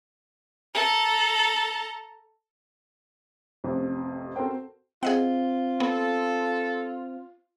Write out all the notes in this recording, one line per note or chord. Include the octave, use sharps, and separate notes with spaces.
A4 A#5
A1 F2 C3
C4 F#4 A4 A#4 C5 G5
C4 F4 G#4 D#5 F#5
B3 A4